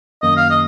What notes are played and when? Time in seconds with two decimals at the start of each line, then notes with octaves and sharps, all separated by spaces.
0.22 F#2 D#3 A#3 D#5
0.37 F5
0.50 D#5